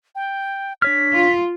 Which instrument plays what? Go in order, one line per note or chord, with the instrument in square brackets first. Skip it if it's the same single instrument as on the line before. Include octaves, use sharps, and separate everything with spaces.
[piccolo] G5
[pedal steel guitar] D4 C#5 F6 [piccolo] B6
[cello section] F4